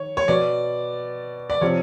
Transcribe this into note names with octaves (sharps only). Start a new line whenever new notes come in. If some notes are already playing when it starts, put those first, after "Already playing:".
Already playing: D#3 C#5
C#5
B2 D5
D5
C3 F3 C#5